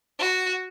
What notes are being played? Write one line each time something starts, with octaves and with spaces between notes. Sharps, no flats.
F#4